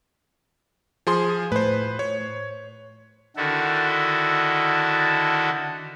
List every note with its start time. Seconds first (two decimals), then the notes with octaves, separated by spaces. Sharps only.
1.07 F3 G#4 C6
1.52 A2 B4 C5
1.99 C#5
3.36 D3 D#3 E4 F#4 A4